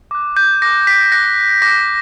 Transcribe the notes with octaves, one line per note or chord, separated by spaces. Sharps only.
D6 F#6
G6
D6 F#6 A#6
B6
D6 F#6 A#6
D6 F#6 A#6